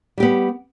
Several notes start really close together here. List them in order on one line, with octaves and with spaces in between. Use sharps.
G3 G4 B3